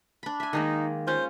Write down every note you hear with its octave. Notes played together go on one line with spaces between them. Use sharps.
D4 B5
E5 G#5
D#3 G#3 A#3 D#4
C#4 F4 C5